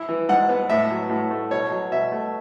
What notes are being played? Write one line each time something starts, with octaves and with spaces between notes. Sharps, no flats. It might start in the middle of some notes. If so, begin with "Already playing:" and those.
Already playing: E4
E3
G#2 F#5
B3
A2 E5
F#3
A2
A3
B2 C#5
F#3
B2 E5
A3